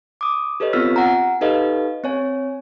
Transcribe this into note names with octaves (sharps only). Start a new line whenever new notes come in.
D6 D#6
G4 A4 B4 C#5 D#5
B3 C4 F4 E6 F6 B6
F#5 G#5 A#5
D#4 G4 A4 B4 D#5 F5
C4 C#5 G#5